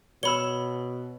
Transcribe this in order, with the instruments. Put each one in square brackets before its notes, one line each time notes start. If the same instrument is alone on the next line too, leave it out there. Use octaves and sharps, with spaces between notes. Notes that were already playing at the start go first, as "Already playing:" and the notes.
[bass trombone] B2 [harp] C#5 E6 [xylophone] B5 G7